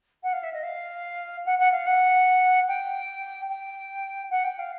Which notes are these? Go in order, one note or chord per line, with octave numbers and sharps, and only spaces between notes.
F#5
F5
E5
D#5
F5
F#5
F#5
F5
F#5
G5
G5
F#5
G5
F5